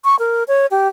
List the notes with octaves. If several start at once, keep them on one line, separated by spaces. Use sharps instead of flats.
C#6
A#4
C#5
G4